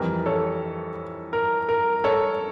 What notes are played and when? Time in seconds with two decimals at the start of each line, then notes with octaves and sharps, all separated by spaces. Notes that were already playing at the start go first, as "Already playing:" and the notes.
Already playing: F2 E3 G3 A#4
0.26 A4 C#5
1.33 A#4
1.69 A#4
2.04 A4 C#5